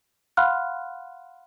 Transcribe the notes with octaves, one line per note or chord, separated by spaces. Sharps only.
F5 F#5 B5 C6 F6 F#6